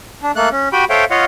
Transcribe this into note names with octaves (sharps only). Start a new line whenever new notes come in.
D4
A3 A#3 A4 F#6
C#4
F#4 G4 G5 B5
A4 C5 C#5 E5 F5 G5
F4 C#5 D#5 F5 F#5